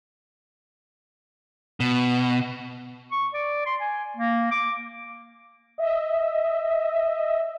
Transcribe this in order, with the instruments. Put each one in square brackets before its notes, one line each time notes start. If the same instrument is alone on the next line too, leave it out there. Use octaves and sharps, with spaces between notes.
[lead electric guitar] B2
[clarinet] C#6
D5
C6
G#5
A#3
D6
[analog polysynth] D#5 E5